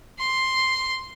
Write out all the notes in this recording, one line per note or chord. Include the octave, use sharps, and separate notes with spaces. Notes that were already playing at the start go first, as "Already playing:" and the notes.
C6